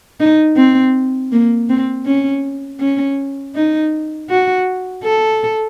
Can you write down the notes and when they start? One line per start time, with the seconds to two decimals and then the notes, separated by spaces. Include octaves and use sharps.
0.20 D#4
0.57 C4
1.32 A#3
1.70 C4
2.06 C#4
2.80 C#4
3.56 D#4
4.30 F#4
5.04 A4